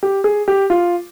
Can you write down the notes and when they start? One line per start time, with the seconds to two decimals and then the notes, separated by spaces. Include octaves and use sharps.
0.03 G4
0.24 G#4
0.48 G4
0.70 F4